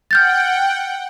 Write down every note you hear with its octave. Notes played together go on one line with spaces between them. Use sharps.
F#5 G5 F6 G6 A6